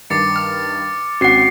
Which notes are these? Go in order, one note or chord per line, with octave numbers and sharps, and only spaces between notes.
G2 D#3 D6 A6 C7 C#7
F6
G#1 C4 C#4 F#4 F#5 C7